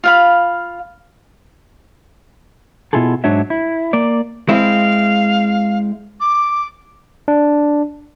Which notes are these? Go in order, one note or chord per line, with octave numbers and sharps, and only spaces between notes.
F4 F5 B5
B2 D3 E4 F4 G#4 A4
G#2 F#3 D4 C#5 E5
E4
A#3 D5
G#3 C4 E4 F5
D6
D4